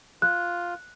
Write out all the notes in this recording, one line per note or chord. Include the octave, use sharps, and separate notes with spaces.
F4 F#6